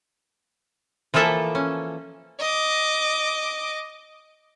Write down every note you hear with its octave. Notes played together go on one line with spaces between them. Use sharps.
E3 F3 A#3 A4 E5
C#4
D#5 D6